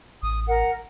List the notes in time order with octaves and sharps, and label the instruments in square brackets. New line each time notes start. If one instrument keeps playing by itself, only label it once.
[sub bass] A1 [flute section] D#6
[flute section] A#4 F#5